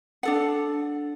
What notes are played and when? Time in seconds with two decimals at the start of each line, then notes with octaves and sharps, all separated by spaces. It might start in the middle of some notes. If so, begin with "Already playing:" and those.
0.23 D4 A4 F#5